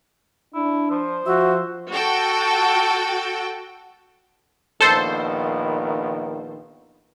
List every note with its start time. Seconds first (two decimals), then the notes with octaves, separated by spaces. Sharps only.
0.55 D4 E4
0.91 F3 C5
1.26 F3 F#4 E5
1.91 F#4 A4 G5
4.80 A#1 D#3 B3 A4 C5